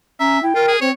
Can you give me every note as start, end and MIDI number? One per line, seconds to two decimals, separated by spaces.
0.20 0.42 61
0.20 0.41 76
0.20 0.38 82
0.43 0.53 64
0.43 0.72 79
0.55 0.66 65
0.55 0.76 70
0.68 0.80 68
0.81 0.91 60
0.81 0.89 72
0.81 0.91 73